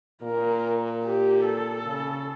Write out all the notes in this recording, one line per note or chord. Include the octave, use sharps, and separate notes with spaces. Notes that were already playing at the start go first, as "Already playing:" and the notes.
A#2 A#4
G4
A4
C#3